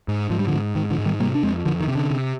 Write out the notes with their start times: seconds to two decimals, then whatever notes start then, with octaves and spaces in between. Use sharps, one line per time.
0.08 G#2
0.30 G#2 F3
0.39 G3
0.47 D3 F3
0.53 G#2
0.75 G#2 D#3
0.90 D3 F3
0.98 G#2
1.06 D#3 G3
1.20 C3 G3 A#3
1.35 D4
1.43 F2 G#3 C4
1.66 F2 D3 F3
1.80 D#3
1.88 C3
1.95 D3
2.11 C3